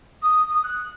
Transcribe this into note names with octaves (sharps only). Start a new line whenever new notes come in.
D#6
D#6
F#6